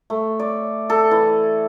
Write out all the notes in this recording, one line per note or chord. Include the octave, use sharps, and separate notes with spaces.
A3
D5
A4
E3